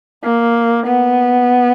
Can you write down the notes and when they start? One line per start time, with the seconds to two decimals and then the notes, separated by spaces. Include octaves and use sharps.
0.23 A#3
0.86 B3